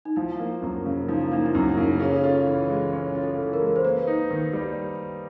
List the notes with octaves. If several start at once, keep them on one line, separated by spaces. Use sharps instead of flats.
D#4
F3 E4
A#3
F#2
C#3
F3 D#4
E4
A#3 D#4
E4
F#2 D#4
E4
C#3
D#4
C#4 G#4
A4
F4 G#4
E3
G#3
C#4
F4
A4
E3
A#4
G#3
C5
A#3 B4
D#4
D#3
G3